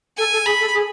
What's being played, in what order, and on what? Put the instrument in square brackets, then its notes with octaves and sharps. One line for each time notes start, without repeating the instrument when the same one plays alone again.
[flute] A4 [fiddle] G#5
[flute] A4
[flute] G#4 [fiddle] B5
[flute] A4
G#4